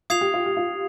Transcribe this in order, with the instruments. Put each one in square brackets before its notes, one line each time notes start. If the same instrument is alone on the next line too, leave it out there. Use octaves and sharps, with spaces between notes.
[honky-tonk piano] F4 [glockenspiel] D#6 G#6 C7 F7
[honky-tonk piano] G4
F4
G4
F4